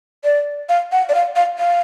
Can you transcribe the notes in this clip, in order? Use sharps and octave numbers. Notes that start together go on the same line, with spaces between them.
D5
F5
F#5
D5
F5
F5
F5